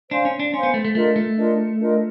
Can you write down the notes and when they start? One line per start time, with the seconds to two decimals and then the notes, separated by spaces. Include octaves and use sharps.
0.10 D4 C5 F5 G#5 C6
0.25 C#4
0.40 D4
0.53 C#4 C5 F5 G#5 C6
0.63 B3
0.74 A3
0.85 A3
0.95 A3 D4 F4 A#4 D#5
1.16 A3
1.37 D4 F4 A#4 D#5
1.80 D4 F4 A#4 D#5